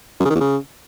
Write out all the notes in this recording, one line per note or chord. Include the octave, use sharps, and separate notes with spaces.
F#2
C#3
D#3
E2
C#3